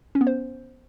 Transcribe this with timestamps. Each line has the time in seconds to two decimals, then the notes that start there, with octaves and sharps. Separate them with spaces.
0.15 C#4
0.21 B3
0.27 C5